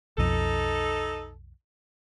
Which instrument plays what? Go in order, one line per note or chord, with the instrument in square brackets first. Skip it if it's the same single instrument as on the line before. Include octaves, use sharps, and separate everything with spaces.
[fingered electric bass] B1 F2 [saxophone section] D#4 A4